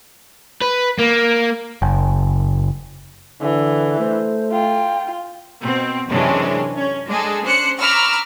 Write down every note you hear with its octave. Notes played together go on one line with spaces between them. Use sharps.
B4
A#3
F#1
D3 E3
A3 C5
F4 G5
B2 C4
F#2 C3 E3 G#3 C#4 D4
C#4
G#3 D4 G#4 A4
C#4 D4 C5 F#6 C#7
A#5 B5 C#6 D6 E6 F6